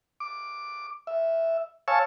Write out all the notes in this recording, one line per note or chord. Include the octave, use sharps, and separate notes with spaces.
D6
E5
C#5 F5 G#5 A5 C#6 E6